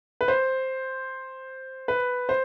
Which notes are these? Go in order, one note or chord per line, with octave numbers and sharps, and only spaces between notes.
B4
C5
B4
C5